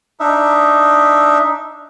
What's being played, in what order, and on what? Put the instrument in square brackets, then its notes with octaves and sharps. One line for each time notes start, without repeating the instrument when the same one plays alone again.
[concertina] D4 D#4 E5